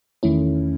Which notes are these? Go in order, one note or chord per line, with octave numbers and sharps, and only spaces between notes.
E2 D#3 A3 C#4 E4